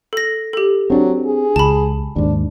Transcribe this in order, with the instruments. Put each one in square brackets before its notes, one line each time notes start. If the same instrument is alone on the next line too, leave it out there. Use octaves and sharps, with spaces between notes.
[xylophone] A4 A#6
G4 A4
[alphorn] F#3 [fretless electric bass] C4 D4
[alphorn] G#4
[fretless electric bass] C#2 [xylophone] A5 B5
[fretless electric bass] D#2 G#2 [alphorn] D4